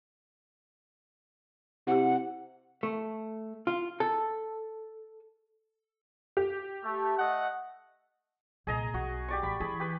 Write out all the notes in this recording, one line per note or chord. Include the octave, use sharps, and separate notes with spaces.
C3 E4 G4 F#5
A3
F4
A4
G4
A3
A3 D#5 F#5
C2 A#2 G#4 D#5 A#5
B1 F#4
G4 D5 C#6
A1 B5
E3 G#4 B5
G4 B4